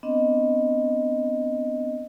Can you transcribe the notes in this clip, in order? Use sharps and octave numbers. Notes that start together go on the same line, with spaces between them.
B3 C4 D4 D#5